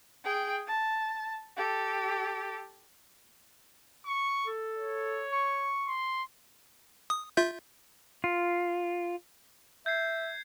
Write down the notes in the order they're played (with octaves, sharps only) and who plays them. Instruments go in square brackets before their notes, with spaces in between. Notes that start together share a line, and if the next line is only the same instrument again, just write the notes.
[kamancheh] G#4 G5
A5
G4 A4
[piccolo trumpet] C#6
[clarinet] A4
[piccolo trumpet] C#5
[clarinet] C#6
[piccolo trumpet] C6
[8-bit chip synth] D#6
F4 E5 G6
[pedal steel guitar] F4
[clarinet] E5 [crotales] G6 G#6 C7